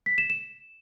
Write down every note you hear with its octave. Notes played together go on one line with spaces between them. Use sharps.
B6
E7
E7